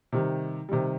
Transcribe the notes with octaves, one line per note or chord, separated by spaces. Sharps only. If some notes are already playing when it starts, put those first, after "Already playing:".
C3 D#3 G3
C3 D#3 G3